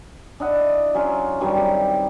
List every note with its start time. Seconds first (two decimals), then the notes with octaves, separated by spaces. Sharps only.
0.40 D4 E4 D#5 F#5
0.94 F#3 C#4 F4
1.41 G2 D#3 F#3 G3
1.57 C3